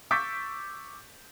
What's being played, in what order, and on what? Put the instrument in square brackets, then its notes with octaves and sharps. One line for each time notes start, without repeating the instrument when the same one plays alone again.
[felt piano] C#6 D6 E6 G6 A6 B6